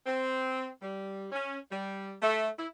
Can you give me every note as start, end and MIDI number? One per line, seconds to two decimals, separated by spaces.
0.06 0.69 60
0.82 1.26 55
1.32 1.58 61
1.71 2.13 55
2.22 2.49 57
2.59 2.67 64